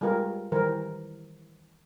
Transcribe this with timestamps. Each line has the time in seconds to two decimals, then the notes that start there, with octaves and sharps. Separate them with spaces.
0.01 G3 G#3 F4 A#4 B4
0.52 D#3 E3 G3 A#4 C5